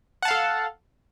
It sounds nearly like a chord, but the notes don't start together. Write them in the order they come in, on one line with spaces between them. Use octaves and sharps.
F#5 A5 F5 A4